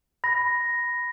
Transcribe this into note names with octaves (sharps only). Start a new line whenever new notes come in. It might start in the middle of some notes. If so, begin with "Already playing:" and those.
B5 A#6